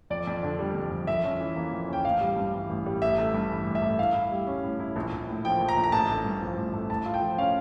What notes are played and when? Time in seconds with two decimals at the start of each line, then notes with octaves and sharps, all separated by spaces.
0.10 F2 D5
0.27 F2
0.43 D3
0.59 G3
0.75 F2
0.91 F2
1.07 F2 E5
1.24 C#4
1.40 E3
1.56 A#3
1.72 F2
1.88 C#4 G5
2.05 A1 F5
2.21 G3
2.36 G2
2.53 E3
2.69 A1
2.86 G3
3.02 A1 E5
3.18 A3
3.34 G2
3.50 E3
3.66 A1
3.75 E5
3.82 A3
3.99 A2 F5
4.15 E4
4.32 G3
4.47 C#4
4.63 A2
4.79 E4
4.96 A#1
5.12 A#1
5.28 A2
5.45 F3 G5
5.60 A#1
5.69 A#5
5.77 A#1
5.84 A#5
5.92 A1 A5
6.08 A3
6.25 G2
6.41 F3
6.57 A1
6.74 A3
6.90 A2 A5
7.06 F4
7.14 G5
7.22 F3
7.38 C#4 F5